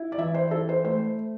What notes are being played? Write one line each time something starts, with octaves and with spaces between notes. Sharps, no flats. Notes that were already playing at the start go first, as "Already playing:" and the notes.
Already playing: E4
D5
E3 E5
C5
E4 A4
C5
A3 C5